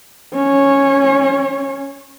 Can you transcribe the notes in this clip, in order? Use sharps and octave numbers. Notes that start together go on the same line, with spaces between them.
C#4 C#5